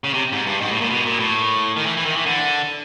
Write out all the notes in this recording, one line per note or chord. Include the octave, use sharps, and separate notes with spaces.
C#3
C3
G#2
G2
G#2
A2
A#2
B2
A#2
A2
D#3
E3
E3
D#3
E3
D3